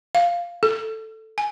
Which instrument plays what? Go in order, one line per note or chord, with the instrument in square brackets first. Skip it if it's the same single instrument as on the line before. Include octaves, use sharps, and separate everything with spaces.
[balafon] F5
A4
G#5